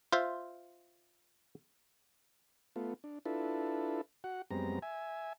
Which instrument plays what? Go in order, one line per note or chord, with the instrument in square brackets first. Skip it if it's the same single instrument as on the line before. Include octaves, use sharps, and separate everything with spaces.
[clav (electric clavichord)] F4 C5 E5
[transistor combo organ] A3 B3 F4
D4
D4 E4 F4 A4 B4
F#4 F#5
F#2 G3 G#3 B3 C4 A#5
E5 G#5